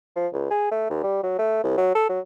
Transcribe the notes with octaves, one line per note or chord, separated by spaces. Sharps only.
F3
C#2
G#4
A3
D#2
G3
F#3
A3
C2
F#3
A4
F#3